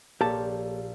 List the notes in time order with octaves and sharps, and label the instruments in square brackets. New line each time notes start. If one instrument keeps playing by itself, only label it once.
[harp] A#1 [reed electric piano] A#3 A4 C#5 [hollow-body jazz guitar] G4 A5